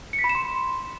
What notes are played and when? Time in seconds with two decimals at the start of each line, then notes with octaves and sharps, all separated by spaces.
0.13 C#7
0.19 B6
0.24 B5
0.29 E7
0.35 C6